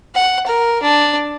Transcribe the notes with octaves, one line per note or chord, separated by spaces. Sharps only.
F#5
A#4
D4